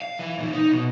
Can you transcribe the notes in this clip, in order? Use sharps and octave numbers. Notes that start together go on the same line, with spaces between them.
F5
E3
A#2 D#3
D#4
B2